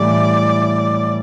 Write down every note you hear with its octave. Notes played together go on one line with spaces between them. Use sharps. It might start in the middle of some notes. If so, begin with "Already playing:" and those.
Already playing: A2 E3 G3 D5